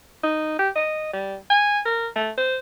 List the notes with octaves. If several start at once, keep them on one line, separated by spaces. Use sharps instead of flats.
D#4
G4
D#5
G3
G#5
A#4
A3
C5